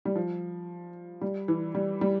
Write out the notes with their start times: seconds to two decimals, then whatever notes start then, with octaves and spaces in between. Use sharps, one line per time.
0.05 G3
0.15 F3
1.21 G3
1.48 E3
1.75 G3
2.01 G3